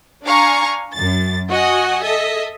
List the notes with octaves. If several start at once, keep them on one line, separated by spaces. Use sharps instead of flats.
D4 F5 G#5 A#5 C#6
F#2 A6
F#4 D#5 F#5 G#5
A4 D#5 E5